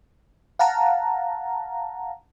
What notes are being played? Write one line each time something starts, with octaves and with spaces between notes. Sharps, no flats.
F5 F#5 A5 A#5